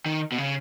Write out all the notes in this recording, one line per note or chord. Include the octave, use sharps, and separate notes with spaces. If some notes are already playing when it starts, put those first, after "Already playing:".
D#3
B2
C#3